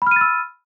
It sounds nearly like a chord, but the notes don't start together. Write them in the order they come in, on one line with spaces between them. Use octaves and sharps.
B5 F6 D#7 A6 E6